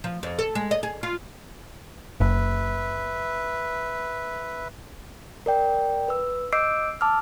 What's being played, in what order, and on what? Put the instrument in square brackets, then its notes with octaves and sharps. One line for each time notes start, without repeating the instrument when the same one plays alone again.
[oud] F3
F2
A4
G#3
D#5
G#4
F4
[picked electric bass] F#1 [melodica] B4 E5
[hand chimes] A#4 D5 G5
B4 E6
D#5 D6 E6 G6 C7 D7
A5 D6 E6 F6